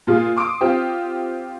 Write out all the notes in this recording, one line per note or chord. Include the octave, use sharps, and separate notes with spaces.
A#2 F4 G#4
C6 D6 D#6 D7
C4 F4 G4 C5